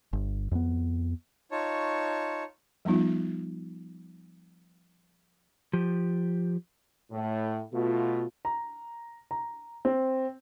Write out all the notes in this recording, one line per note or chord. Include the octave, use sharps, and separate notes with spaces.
G1
F2 B3
D#4 F4 C#5 A5 C#6
F3 G3 B3 D#4 F4
F3 G4
A2
B2 A3 F4
A#5
A#5
C4